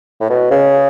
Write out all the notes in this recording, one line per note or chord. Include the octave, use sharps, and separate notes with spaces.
A2
B2
C#3